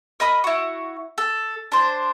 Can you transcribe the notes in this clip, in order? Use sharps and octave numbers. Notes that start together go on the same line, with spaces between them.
A#4 D#5 B5 D#6
E4 F#4
A4
D4 C5